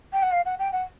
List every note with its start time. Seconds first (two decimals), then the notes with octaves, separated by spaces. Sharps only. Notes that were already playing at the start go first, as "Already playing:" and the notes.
0.13 G5
0.22 F#5
0.32 F5
0.45 F#5
0.59 G5
0.72 F#5